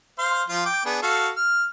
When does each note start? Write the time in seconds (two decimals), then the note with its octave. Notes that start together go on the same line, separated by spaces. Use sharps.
0.18 C5 F5 C6
0.49 F3 F4
0.65 G5 D6
0.86 B3 D4 G#4
1.03 F#4 A4 F5
1.36 F6